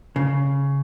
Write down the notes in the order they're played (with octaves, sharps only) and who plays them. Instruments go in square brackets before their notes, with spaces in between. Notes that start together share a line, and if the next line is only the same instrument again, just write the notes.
[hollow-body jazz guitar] C#3